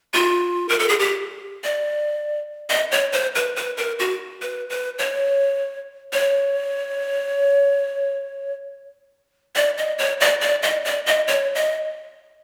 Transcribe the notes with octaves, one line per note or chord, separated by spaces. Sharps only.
F4
A#4
A4
G#4
G4
D5
D#5
C#5
C5
B4
B4
A#4
F#4
B4
B4
C#5
C#5
D5
D#5
C#5
D5
D5
D#5
D5
D#5
C#5
D#5